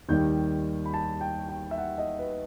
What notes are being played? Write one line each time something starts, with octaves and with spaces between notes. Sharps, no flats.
D#2 D#3 G3 G6
B5
A5
G5
G5
E5
F#5
D#5
B4